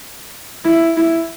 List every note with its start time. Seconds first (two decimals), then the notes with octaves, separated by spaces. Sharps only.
0.65 E4
0.97 E4